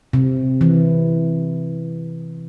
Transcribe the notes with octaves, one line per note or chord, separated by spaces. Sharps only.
C3
E3